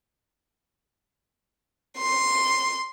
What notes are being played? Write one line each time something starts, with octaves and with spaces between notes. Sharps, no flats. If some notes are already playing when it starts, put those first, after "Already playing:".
C6